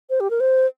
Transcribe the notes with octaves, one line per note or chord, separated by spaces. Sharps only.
C5
G4
A#4
C5